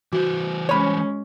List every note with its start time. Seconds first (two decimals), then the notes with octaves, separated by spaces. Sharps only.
0.13 E3 F#4 B4 C5
0.69 G#3 C#4 C#5 B5